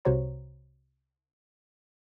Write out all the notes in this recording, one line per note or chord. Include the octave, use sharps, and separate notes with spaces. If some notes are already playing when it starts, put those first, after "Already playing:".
C2 C3 F#4 C5 C#5 A#5